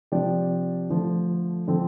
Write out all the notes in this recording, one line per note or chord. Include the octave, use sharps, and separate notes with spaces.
C3 F3 D4 G4 D5
D3 F3 A3
D3 F3 C4